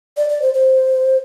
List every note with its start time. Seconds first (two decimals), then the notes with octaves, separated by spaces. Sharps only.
0.17 D5
0.29 D5
0.42 C5
0.54 C5